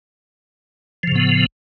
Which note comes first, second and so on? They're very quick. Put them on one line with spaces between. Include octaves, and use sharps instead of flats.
F3 C#3 A2 B3